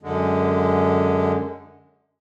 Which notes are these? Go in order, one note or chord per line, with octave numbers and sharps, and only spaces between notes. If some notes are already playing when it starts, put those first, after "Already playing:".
F#2 D3 G#3